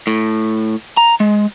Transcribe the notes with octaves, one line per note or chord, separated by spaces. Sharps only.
A2
A#5
G#3